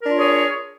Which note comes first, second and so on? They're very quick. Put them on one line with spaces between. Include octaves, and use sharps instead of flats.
A#4 D4 F4 C#5 G#4